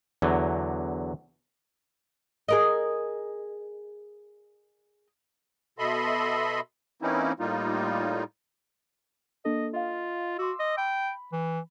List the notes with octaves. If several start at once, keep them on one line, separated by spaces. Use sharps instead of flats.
E2 D3 F#3
G#4 A#4 D#5
B2 A4 D#5 E5 B5 C6
E3 A#3 C4 C#4 D#4 E4
A2 G3 A#3 D#4 F4
A#3 D4 A4 D#5
F4 D#5 F5
F#4 C6 D6 E6
D#5
G5 B5
E3